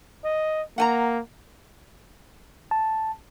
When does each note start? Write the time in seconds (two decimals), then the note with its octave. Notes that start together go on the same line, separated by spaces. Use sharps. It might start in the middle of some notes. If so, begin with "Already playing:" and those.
0.24 D#5
0.78 A#3 F#5 G#5 A#5
2.71 A5